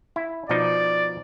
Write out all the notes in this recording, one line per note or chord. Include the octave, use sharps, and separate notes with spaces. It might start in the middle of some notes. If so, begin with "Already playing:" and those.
E4
B2 F3 D#4 D5